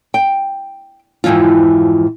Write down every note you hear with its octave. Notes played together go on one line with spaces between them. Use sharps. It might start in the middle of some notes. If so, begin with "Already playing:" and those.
G5
F2 G#2 E3 F3 F4